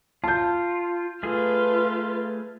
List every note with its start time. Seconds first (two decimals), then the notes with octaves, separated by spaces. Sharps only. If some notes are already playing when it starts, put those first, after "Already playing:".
0.24 F4 A5 G6
1.23 A3 F4 G#4 B4